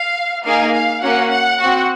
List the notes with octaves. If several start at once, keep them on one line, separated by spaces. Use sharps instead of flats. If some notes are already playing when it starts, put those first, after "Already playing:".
Already playing: F5
A#3 D#4 G#4 F5
F5
A#3 C#4 F#4 F#5
F#5
C4 F#4